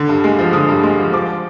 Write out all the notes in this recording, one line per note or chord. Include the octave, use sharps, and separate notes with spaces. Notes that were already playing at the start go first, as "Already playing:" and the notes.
Already playing: D3
G2
G#3
F3
D3 D#6
G2
G#3
F3
F3 D6